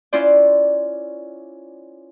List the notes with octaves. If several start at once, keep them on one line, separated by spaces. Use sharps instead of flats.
C#4 E4 F4 B4 C5 D5